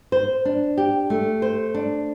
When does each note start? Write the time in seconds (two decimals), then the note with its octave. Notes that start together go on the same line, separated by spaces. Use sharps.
0.12 C5
0.45 D4
0.77 G4
1.10 A3
1.42 C5
1.75 D4